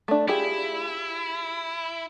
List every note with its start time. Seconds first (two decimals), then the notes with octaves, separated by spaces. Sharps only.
0.08 A3 D4
0.28 E4 F4 G4 G#4